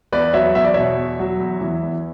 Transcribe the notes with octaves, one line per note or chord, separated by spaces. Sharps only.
E2 B4 D5
F#3 C#5 E5
E2 E5
D5
B2 C#5 E5
E2
F#3
E2
E3
E2